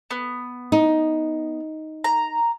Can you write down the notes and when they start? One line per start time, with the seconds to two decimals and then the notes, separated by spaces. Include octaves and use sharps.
0.11 B3
0.72 D#4
2.04 A#5